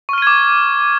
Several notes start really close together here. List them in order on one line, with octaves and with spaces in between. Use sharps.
C#6 F6 D#7 G#6 D6